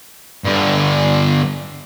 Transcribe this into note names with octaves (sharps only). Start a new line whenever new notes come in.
G2 D3